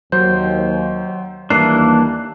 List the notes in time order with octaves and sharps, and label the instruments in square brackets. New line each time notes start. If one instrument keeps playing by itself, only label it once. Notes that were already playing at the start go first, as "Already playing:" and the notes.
[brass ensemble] D#2 [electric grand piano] F#3 C5 [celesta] G6
[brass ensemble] D#2 G3 A5 [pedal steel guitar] E3 A#3 D4 [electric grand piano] F#6 [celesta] C7